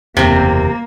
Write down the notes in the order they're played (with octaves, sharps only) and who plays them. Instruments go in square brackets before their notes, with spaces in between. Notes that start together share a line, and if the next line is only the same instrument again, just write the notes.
[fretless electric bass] F#1 E2 [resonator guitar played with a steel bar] C3 C4 [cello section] A#3